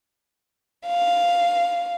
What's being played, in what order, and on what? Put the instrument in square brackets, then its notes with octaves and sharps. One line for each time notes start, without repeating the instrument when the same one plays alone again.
[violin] F5